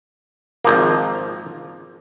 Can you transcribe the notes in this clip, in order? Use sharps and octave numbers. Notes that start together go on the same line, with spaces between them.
G#1 F3 A#3